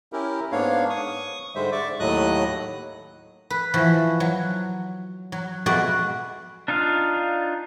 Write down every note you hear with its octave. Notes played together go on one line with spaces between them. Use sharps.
C#4 E4 G4 A#4
G#2 A#3 B3 D4 C#5 F5
C#6 D#6
G#2 D3 G3 G#3 C5 E5
D5 E5 C#6 D6
D#2 A2 F#3 D#5 D#6 F#6
B4
E3 F3 F#4
F#3
F#3
F2 B2 G#3 F#4 D5
D4 D#4 F4 F5